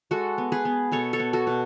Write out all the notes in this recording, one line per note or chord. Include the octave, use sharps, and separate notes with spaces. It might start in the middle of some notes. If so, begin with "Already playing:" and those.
G#3 F#4 A4
B3
G#4 B4
B3
B2 A4 C#5
A4 C#5
B3
F#4 A4
B2